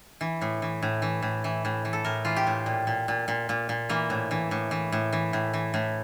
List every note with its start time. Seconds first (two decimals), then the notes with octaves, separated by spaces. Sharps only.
0.21 E3
0.41 A2
0.62 E3
0.82 A2
1.02 E3
1.22 A2
1.44 E3
1.65 A2
1.85 E3
1.93 A4
2.04 A2 A#4
2.25 E3 F4
2.36 G4
2.47 A2
2.66 A#2
2.87 A#2
3.08 A#2
3.28 A#2
3.49 A#2
3.69 A#2
3.89 E3 A#3
4.10 A2
4.31 E3
4.51 A2
4.71 E3
4.92 A2
5.13 E3
5.33 A2
5.53 E3
5.74 A2